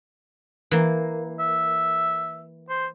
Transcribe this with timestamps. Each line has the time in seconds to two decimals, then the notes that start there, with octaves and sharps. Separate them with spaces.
0.71 E3 A#3
1.40 E5
2.70 C5